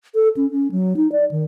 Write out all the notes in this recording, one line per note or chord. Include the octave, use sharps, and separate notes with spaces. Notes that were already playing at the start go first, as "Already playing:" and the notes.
A4
C#4
C#4
F#3
D#4
D5
D#3